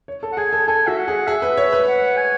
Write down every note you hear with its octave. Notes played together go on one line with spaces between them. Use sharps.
C#5
A4
F#5
G#4 G#5
A4
A4 G#5
F#4 E5
F#5
G#4
G#4 E5
B4
C#5
B4
F#5
G#5